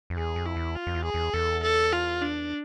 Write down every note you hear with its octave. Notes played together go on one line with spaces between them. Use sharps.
F2
E2 G#4
F2
E4
E2
F4
F2
E2
G#4
E2
E2 A4
A4
F4
D4